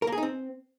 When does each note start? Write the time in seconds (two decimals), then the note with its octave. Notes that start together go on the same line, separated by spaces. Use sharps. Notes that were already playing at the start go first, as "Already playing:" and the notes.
0.02 A#4
0.07 A#3
0.12 G#4
0.18 D#4
0.23 C4